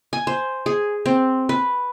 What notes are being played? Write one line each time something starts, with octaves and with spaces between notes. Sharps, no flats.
G#5
C5
G#4
C4
B4